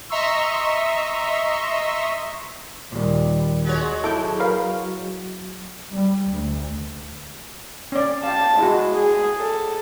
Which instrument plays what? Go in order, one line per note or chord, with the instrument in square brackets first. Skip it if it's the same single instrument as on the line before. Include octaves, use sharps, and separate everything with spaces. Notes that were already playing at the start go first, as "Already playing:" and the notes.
[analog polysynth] D#5 E5 A#5 C6 C#6 E6
[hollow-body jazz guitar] D#2 A#2 [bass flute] G3
[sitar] G#3 F#4 C#5
[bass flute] F#3 [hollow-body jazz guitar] E4 [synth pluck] A4 D6 G6
[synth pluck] A#4 B4 F5
[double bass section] G3
D2
[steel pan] C#4 D5
[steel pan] F5 G5 [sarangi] A5
[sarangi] G#3 [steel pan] E4 F#4
[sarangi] G#4
A4